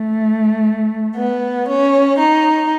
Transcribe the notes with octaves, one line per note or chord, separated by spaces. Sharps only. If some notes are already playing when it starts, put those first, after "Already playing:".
Already playing: A3
B3
C#4
D#4